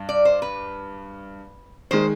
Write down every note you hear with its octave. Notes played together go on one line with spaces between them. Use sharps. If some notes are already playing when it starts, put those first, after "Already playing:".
Already playing: G2
D5
C5
B4
D#3 G#3 C5